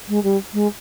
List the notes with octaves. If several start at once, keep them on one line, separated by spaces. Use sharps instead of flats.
G#3
G3
G#3